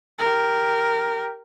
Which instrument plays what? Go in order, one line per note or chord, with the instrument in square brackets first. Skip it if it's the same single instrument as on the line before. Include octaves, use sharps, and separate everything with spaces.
[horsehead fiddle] G4 A#4